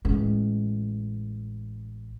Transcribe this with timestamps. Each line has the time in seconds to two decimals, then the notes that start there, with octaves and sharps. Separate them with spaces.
0.05 A1 G#3